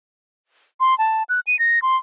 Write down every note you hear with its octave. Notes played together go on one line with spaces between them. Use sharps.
C6
A5
F#6
D#7
A#6
C6